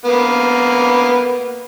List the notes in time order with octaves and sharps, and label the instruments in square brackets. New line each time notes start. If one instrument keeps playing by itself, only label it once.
[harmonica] A#3 B3